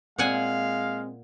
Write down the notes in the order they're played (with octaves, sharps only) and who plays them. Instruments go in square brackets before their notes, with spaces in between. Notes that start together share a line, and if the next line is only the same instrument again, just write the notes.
[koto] A#2 F#5 G#5 [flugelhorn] G#3 [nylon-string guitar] C4 [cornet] F5